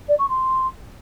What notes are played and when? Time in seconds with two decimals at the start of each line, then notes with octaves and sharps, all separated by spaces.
0.08 D5
0.19 C#6
0.29 C6